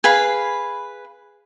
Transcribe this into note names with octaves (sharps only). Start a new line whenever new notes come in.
G#4 B4 F5 B5